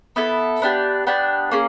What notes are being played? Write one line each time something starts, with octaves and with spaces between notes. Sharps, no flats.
B3 E4 A4
B3 D4 G4
B3 D4 G4
A#3 C#4 G#4